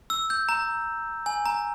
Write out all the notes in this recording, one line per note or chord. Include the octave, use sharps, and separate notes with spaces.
E6
G6
A#5
G#5
A#5